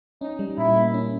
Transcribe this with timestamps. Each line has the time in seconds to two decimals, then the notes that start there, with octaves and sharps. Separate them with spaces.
0.21 C#4 D#4
0.39 G3
0.57 A#2 E4
0.76 A#3
0.94 C#4